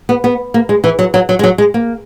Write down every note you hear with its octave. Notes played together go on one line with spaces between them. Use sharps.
B3
B3
A#3
G#3
E3
F#3
F#3
F#3
G#3
F#3
G#3
A#3